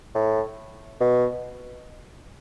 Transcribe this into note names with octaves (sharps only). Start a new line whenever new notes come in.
A2
B2